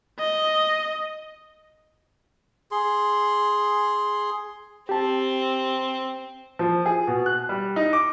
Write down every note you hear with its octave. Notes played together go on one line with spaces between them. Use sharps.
D#5
G#4 C6
C4 G4 A5
F3
G#4
B2
F#6
G3
D#4
D6